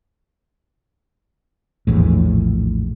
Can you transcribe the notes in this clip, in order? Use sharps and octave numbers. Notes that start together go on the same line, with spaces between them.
A#1 E2 A2